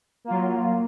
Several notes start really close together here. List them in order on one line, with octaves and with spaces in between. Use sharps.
A#3 F4 F#3